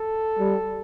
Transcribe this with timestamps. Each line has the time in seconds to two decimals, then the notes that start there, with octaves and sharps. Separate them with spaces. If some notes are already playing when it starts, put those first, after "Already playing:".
Already playing: A4
0.39 G3